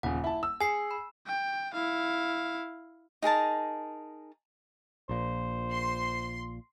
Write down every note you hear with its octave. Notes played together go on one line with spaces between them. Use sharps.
D#1 C#3 F#5
E4 A5
E6
G#4 G#5 C7
B5
G5
E4 F5
D#4 G#4 A#4 A5
A#1 A#2 C5
C6